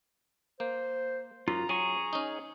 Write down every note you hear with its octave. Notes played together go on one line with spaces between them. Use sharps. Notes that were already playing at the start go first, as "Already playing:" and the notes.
A#3 C5
F#2 F4 A#5
F#3 G#4 G#5 C#6
C#4 D#4